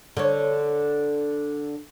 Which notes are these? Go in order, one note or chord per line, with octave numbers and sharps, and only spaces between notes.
D3 C#5